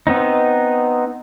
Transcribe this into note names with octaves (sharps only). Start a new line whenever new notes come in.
B3 C4 D#4